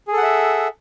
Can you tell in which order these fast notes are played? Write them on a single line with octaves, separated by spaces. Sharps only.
G#4 A4 F#5 E5